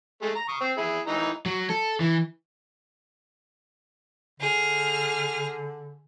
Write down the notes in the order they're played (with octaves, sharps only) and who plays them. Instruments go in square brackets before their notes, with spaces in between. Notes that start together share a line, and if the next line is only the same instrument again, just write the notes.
[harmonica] G#3 A3
A#5
C#6 D#6
C4
E4 G#4
E3 D#4 A#5
[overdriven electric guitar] F#3
A4
E3
[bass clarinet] D3 [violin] G#4 F6